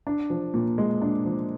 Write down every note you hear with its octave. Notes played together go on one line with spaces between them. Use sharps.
D4
F3
A#2
G#3
D4
F3